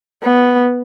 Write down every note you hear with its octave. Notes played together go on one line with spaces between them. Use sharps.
B3